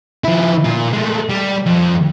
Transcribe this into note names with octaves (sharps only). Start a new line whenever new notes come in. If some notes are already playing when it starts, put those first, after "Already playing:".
F3 E4
A#2 F4
G#3 A3
G3
F2